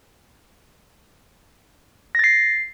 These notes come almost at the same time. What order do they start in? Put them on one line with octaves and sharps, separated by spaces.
A#6 A6 C7